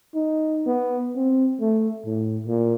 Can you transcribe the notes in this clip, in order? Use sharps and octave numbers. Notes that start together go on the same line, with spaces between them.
D#4
B3
C4
A3
A2
A#2